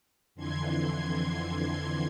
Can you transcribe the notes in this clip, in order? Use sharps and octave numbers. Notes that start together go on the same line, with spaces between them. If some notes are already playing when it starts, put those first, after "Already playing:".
F2 D3 E3 C6 G#6